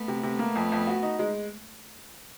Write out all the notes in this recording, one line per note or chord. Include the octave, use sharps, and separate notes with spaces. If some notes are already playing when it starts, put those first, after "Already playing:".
Already playing: A3 B3
C3
C3
A#3
F2
F2
F#4
D#4
G#3